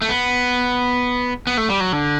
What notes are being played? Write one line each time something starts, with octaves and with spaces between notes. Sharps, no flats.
A3
B3
B3
A3
G3
F#3
D3